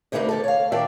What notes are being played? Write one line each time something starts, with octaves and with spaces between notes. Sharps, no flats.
D2 C3 A#3 D4 D#4 B4
E2 D3 A4
C#5 F5
A#2 D#3 D4 D5 E5 G5